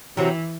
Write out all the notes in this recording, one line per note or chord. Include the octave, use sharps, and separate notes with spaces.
C3 E3 F#3 C4